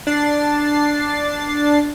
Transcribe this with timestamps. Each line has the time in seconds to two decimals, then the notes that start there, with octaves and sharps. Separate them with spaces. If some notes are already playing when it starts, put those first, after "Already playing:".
0.07 D4 A6 C7